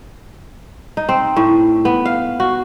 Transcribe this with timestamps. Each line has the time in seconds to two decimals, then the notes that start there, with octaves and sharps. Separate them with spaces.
0.97 D#4
1.09 C4
1.37 A2
1.85 B3
2.05 F5
2.40 F#4